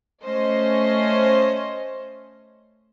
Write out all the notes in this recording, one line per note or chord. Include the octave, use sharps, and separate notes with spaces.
A3 C#4 C5 D#5